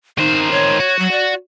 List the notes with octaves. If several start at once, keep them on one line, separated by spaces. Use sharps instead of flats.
D#3 D#4 C5
C#5
F#4
F#3
D5